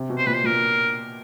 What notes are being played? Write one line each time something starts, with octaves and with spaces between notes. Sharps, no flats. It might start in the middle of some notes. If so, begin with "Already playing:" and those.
Already playing: C3
B2
C5
A#2 B4
C5
A#2 A#4